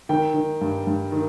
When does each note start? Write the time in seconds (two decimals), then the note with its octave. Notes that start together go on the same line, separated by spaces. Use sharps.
0.09 D#3 G5
0.34 D#3
0.61 G2
0.87 G2
1.12 D#3